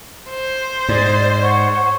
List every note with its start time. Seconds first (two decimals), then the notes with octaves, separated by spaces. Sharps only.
0.30 C5
0.89 G#2 D5
1.42 C#5 F#5